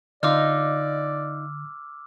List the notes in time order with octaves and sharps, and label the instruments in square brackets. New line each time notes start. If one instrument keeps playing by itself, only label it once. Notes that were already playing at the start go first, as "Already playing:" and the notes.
[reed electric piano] D3 [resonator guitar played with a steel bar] D#4 F4 [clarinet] D5 [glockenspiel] D6 E6 F6